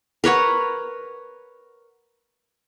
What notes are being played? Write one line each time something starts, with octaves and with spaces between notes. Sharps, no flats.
A#4 B4 C#5 F#5